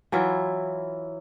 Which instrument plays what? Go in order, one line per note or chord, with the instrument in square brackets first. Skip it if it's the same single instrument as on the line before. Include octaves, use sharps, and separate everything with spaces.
[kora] E3 F#3 E4 F4